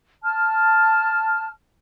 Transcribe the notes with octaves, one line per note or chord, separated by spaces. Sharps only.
A5 F6